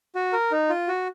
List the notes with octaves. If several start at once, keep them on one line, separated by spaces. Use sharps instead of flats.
F#4
A#4
D#4
F4
F#4